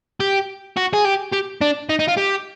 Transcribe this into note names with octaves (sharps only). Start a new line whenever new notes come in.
G4
F#4
G#4
G4
G4
D4
D#4
D#4
F4
G4